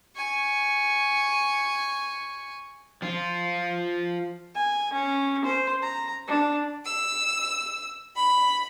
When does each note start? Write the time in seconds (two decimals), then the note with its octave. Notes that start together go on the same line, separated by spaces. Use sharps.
0.15 G#5 C#6
3.02 F3 F4
4.55 G#5
4.93 C#4
5.44 C5
5.82 A#5
6.27 D4
6.85 E6
8.16 B5